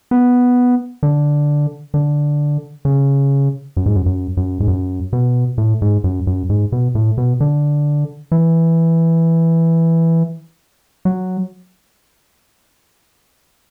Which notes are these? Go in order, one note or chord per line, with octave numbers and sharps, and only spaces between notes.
B3
D3
D3
C#3
F#2
G#2
F#2
F#2
F#2
G#2
F#2
B2
A2
G#2
F#2
F#2
G#2
B2
A2
B2
D3
E3
F#3